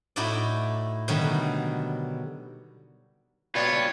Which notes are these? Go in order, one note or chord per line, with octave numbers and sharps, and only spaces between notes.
A2 D#4 E4 F#4 A4 D5
B2 D3 D#3 F#3 G3
B2 F4 B4 C#5 D5 G5